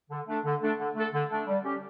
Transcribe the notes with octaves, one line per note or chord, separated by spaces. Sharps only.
D3
A3 D4 A4
D3
A3 D4 A4
D3
A3 D4 A4
D3
A3 D4 A4
G3
C#4 G4